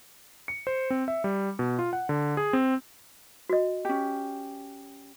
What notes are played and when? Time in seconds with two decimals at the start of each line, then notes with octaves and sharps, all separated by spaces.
0.48 C#7
0.67 C5
0.90 C4
1.08 E5
1.24 G3
1.59 B2
1.79 F4
1.93 F#5
2.09 D3
2.37 G#4
2.53 C4
3.49 F#4 D#5
3.85 C#4 G4